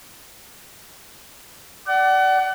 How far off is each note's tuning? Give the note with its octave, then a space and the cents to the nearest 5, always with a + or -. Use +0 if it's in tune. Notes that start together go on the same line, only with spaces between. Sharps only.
D5 +0 F#5 +35